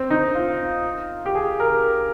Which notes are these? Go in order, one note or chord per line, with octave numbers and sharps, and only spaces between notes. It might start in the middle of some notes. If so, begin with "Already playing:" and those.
Already playing: C4
D#4
F4
G4
G#4
A#4